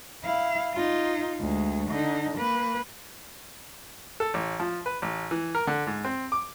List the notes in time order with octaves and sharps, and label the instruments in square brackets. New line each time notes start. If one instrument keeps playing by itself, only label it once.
[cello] E4 F5
D#4 F4
D2 G#3
D3 D#4
A#3 B4
[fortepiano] A4
A1
F3
B4
A1
E3
A#4
D3
G#2
C4
D6